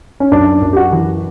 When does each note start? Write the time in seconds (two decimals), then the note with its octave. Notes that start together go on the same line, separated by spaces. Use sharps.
0.20 C#4
0.32 F#2 D4
0.62 F#2
0.73 G4
0.77 F#4
0.92 E3